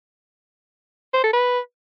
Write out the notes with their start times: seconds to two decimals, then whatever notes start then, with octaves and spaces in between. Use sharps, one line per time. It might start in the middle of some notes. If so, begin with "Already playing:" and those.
1.14 C5
1.24 A4
1.33 B4